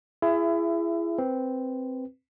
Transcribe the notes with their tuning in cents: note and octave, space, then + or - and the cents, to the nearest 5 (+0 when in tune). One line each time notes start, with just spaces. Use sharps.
E4 +30 G#4 +0 E5 +20
C4 -5 B4 +0